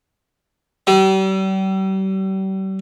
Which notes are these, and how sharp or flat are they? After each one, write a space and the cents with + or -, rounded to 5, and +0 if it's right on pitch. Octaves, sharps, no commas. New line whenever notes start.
G3 -40